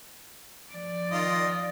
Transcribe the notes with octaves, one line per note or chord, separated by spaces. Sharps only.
F3 D5
D#3 F4 D#5